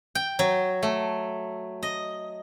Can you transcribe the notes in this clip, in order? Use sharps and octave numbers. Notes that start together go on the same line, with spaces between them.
G5
F#3
A3
D#5